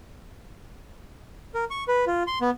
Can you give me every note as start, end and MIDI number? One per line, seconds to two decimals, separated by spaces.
1.54 1.64 70
1.70 1.84 85
1.88 2.05 71
2.07 2.23 65
2.27 2.39 84
2.41 2.50 59